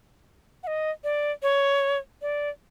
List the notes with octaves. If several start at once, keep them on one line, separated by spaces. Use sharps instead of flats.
F#5
D#5
D5
C#5
D5